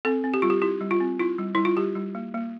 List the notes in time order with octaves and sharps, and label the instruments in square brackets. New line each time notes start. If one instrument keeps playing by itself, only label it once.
[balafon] C4 A4
C4
G4
G3 F4
G4
E4 G4
G3
F4
C4
E4 F4
G3
G3 E4
F4
G3 G4
G3
A#3
A#3